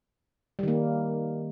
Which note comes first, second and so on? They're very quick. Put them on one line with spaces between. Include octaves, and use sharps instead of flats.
G3 D#3 A#3